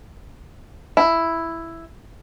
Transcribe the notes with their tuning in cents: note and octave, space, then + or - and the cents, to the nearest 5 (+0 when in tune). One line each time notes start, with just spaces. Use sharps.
E4 +5